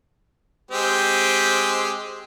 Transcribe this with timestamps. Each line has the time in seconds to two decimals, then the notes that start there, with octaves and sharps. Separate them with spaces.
0.71 G#3 C4 G4